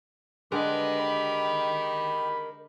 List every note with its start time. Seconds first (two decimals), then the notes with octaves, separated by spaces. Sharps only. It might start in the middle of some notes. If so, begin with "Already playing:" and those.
0.52 D3 G#3 G4 A#4 B4 D#5
1.00 B5